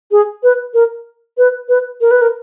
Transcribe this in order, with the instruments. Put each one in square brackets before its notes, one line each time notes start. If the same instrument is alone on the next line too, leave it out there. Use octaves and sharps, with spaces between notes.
[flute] G#4
B4
A#4
B4
B4
A#4
B4
A#4